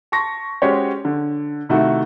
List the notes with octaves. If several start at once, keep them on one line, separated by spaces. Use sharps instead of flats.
A5 C6 C#6 A#6
G#3 C#4 F#4 G4 C5 C#5
D3
C3 D#3 A3 E4 F#4